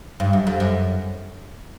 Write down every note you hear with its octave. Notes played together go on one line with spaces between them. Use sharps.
G2
F#2
F2
F#2